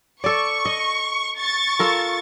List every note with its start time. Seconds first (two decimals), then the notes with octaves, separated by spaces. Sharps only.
0.24 A4 D5 C#6
0.65 D#5
1.39 C#6 A6
1.80 F4 A4 A#4